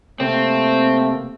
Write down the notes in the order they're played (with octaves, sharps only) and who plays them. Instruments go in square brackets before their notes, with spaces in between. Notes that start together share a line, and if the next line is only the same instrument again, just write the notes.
[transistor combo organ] C3 A#3 [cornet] A3 [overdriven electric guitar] C4